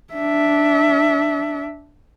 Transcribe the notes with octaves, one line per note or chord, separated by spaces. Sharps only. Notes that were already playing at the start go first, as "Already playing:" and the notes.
D4 E5